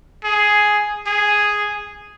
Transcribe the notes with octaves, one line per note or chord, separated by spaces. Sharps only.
G#4
G#4